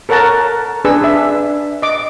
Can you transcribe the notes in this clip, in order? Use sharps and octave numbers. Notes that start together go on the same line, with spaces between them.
A4 A#4 C#5 F#5 A5 A#5
D4 G#4 B4 E6
D4 E5
D#5 D6